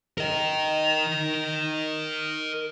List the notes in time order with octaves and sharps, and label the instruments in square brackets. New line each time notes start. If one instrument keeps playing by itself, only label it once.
[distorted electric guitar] A#4 D#5